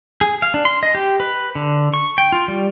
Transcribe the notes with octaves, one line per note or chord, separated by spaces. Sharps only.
G#4
F5
D4
C6
D#5
G4
B4
D3
C#6
G5
F4
G3